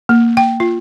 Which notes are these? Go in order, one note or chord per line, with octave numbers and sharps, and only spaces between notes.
A#3
G5
F4